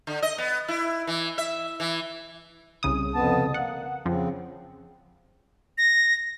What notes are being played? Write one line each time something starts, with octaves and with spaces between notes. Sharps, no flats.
D3
D#5
B3
E4
E3
E5
E3
C2 C#3 D#6
F2 B3 A5
A#3 F#5
F2 C#3 F3 C4
A#6